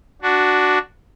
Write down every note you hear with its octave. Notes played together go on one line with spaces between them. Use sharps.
D4 F#4